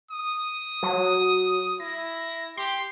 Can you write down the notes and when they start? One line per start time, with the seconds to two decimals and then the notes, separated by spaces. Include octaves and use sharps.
0.11 D#6
0.83 F#3
1.80 E4 A#6
2.57 G4 C6